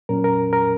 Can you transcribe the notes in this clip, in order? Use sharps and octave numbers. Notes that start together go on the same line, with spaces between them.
A#2 F#3 C#4 A#4
A#4
A#4